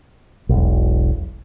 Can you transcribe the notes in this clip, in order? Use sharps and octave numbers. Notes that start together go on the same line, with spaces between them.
E1 B1